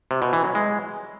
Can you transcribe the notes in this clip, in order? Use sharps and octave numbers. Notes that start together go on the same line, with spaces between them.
C3
B2
E3
F#3
G#3